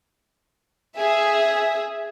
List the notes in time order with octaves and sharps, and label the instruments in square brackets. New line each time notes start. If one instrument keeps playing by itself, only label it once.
[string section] G#4 E5